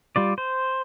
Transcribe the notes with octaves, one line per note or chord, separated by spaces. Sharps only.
G3 F4 D5
C5